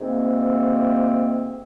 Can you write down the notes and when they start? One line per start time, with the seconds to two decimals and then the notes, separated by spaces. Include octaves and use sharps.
0.01 D2 G#2 A#3 C4